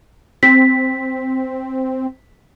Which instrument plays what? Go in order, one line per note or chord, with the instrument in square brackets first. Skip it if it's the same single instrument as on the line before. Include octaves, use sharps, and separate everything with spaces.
[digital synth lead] C4 [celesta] B6